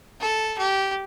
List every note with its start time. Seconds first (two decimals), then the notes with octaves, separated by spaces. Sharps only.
0.21 A4
0.58 G4